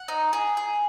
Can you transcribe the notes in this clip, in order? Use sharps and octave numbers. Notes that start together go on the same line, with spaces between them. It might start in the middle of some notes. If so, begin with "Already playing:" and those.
Already playing: F#5
D#4
G#4
G#4